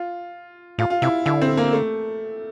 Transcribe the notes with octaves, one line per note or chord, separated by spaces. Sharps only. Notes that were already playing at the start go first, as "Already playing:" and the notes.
Already playing: F4
A2 F4
F4
C3 E4
D3 E4
C4
A#3
A3